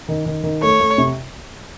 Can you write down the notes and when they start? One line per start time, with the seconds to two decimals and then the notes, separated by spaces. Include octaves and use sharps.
0.09 D#3
0.26 D#3
0.43 D#3
0.62 A3 C#5
0.80 A3
0.98 C3